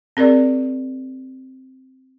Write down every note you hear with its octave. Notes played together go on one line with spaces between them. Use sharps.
C4 G#4 A#4 D5